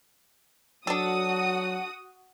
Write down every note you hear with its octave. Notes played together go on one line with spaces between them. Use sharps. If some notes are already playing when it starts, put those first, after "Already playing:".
F#3 D4 F#4 A4 D#6